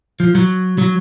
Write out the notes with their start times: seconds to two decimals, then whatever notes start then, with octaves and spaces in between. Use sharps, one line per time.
0.20 F3
0.35 F#3
0.78 F#3